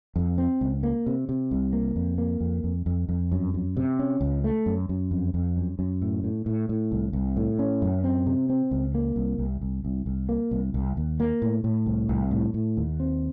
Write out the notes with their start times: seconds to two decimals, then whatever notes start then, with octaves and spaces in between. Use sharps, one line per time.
0.16 F2
0.38 C4
0.61 C#2
0.83 A#3
1.06 C3
1.29 C3
1.51 C2
1.73 A#3
1.96 F2
2.18 A#3
2.41 F2
2.64 F2
2.86 F2
3.09 F2
3.32 F#2
3.54 F#2
3.77 C3
3.99 C#4
4.21 C#2
4.44 A3
4.66 F#2
4.89 F#2
5.11 F2
5.34 F2
5.57 F#2
5.79 F#2
6.02 A2
6.24 A2
6.46 A2
6.69 A2
6.92 C2
7.13 C2
7.37 A2
7.59 C#4
7.82 F#2
8.04 C4
8.27 C3
8.50 C4
8.71 C#2
8.95 A#3
9.16 C2
9.38 C2
9.61 C2
9.85 C2
10.06 C2
10.29 A#3
10.51 C2
10.74 C2
10.97 D#2
11.20 A#3
11.42 A2
11.64 A2
11.86 C2
12.09 C2
12.31 A2
12.54 A2
12.77 D#2
13.00 C4